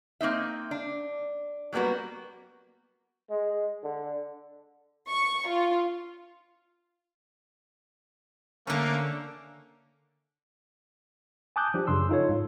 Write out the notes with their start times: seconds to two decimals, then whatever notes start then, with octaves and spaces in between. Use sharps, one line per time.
0.21 A#3 C4 D#4 E5
0.71 D4
1.73 F#3 G3 A#3 B3 F#4
3.30 G#3
3.83 D3
5.06 C#6
5.47 F4
8.67 D3 A3 A#3 C#4
11.56 G#5 A5 D6 D#6 F#6 G6
11.74 F3 D4 G4
11.87 F#2 C#3 C6 E6
12.09 D#4 F4 A4 C#5
12.29 G#2